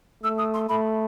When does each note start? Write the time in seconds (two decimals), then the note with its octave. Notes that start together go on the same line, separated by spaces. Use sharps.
0.23 A3 E6
0.38 D#6
0.54 C6
0.69 A3 B5